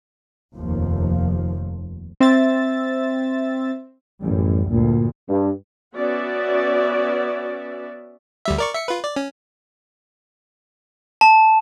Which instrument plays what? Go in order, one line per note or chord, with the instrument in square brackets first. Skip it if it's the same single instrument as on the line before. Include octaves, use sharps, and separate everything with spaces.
[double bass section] F1 D#2 F3
[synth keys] C4 E5 E6 A6
[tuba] A1 [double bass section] F#2 G3
[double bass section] D2 G2 [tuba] A#2
[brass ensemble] G2
[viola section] B3 C#4 F#4 D5 E5
[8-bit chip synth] D2 G3 E5
A#4 D5 C#6
E5 C#7
F4 B4
D5
C#4
[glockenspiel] A5